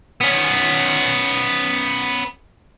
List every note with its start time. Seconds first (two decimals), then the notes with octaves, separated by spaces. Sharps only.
0.21 B3 C#4